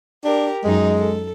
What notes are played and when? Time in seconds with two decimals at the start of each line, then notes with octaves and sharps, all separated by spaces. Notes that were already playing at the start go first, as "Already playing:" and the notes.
0.24 D4 G4 A#4
0.64 F#2 G#3 D#4
0.98 A4